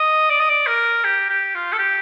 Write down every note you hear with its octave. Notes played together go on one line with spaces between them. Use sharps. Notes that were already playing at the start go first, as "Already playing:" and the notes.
Already playing: D#5
D5
D#5
D5
A#4
G4
G4
F4
A4
G4